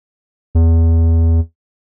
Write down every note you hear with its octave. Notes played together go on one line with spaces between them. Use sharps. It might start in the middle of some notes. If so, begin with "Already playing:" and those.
E2